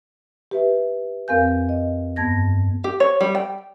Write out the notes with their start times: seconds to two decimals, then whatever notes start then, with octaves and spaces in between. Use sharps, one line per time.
0.51 G4 B4 E5
1.28 F2 C4 A#4 F5 G#5 G6
1.69 D#5
2.16 G2 B3 A5 G#6 A#6
2.84 G4
3.00 C#5
3.21 G3
3.35 G5